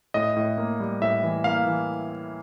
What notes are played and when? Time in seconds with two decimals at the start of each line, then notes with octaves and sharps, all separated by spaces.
0.14 A2 D#5
0.36 A2
0.57 A#3
0.80 G3
1.01 A2 E5
1.23 E3
1.44 A#3 F5
1.67 E3